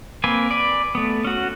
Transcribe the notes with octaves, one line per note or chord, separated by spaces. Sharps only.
A#3 C4 B4 G#5
B4 D5
A3 B3
C#4 F#4